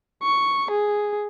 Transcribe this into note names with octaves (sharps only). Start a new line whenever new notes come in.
C#6
G#4